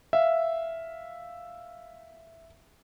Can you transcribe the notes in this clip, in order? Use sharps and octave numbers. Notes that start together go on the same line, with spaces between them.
E5 F5